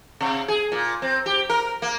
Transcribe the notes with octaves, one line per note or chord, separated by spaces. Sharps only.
C3
G#4
A#2
C4
G4
A#4
A#3